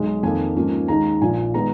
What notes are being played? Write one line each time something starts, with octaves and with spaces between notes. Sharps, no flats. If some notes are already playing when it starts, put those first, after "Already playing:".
Already playing: B1 G#3
F2 D#3 A#3 G#5
G#2 F3 A#3 C#4
D#2 D#3 G#3 A#5
A#1 A#2 F3 G#5
D#3 G#3 B3 A#5